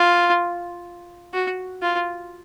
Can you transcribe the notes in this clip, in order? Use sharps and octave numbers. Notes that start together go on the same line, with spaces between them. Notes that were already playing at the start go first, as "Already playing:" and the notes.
Already playing: F4
F#4
F4